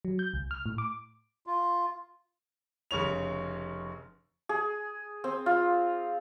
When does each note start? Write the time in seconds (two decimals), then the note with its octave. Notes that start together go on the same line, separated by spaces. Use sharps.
0.05 F#3
0.19 G6
0.34 C#2
0.51 F6
0.66 A2
0.78 D6
1.47 F4
2.91 F1 C#3 C#5 F7
4.49 G#4
5.24 C4
5.46 F4